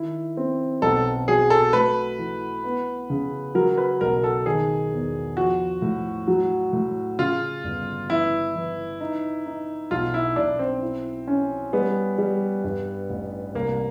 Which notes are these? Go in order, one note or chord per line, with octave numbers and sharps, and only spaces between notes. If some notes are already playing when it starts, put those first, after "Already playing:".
Already playing: D#3 E4
C4
B1 A4
F#3 G#4
A4
A3 B4
E3
B3
C#3
F#3 A#4
B4
B1 A#4
A4
D#3 G#4
E2
F3 F#4
A2
F#3
A2
C#3 F4
G1
E3 E4
E3
D#4
D#4
B1 F4
E4
B1 D4
C4
E4
C#4
G3 B3
G3
G2
A1
C2 A#3